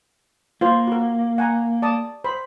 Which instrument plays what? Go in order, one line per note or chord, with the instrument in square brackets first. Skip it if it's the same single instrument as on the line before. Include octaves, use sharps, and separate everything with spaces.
[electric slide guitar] A#3 [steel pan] F4 C5
[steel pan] F#4 A#4
F#5 G#5 A#5
D5 A5 D#6
C5 B5